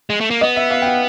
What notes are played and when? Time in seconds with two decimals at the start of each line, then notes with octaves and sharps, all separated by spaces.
0.10 G#3
0.21 A3
0.30 A#3
0.41 B3 D#5
0.56 E5
0.71 F5
0.82 G5
0.87 F#5